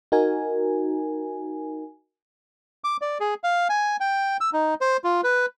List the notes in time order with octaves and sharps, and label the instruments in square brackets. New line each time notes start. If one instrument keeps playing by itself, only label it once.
[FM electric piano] D#4 F#4 A#4 G#5
[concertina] D6
D5
G#4
F5
G#5
G5
E6
D#4
C5
F4
B4